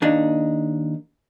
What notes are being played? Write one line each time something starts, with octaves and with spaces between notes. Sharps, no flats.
D#2 A#3 D4 D#4